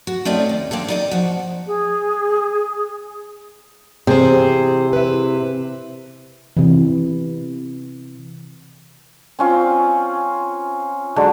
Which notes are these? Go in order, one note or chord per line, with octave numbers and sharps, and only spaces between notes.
F#4
A3 C4 C#4 D#4 D5 D#5
D#2
A#3 C4 D4 A4
D#4 D5 D#5
F3 F#4
G#4
C3 E3 G#4 C5
E4 B4
C3 E3
C4 C#4 F4
D3 F#3 G#3 D4